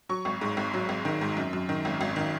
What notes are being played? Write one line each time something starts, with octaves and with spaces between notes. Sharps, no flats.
F#3 C#6
G#1
G#2
G#1
F#3
G#1
D#3
G#2
F#2
F#2
D#3
G#1
G#1
D#3